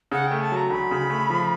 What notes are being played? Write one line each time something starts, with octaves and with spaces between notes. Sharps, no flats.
C#3 F#5
A3 G5
A5
F#3 A#5
D2 B5
C#3
A3
F3